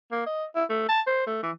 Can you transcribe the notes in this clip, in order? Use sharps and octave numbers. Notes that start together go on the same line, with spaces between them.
A#3
D#5
E4
A3
A5
C5
A3
E3